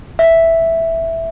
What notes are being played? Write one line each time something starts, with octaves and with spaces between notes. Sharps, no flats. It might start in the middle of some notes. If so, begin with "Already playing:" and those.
E5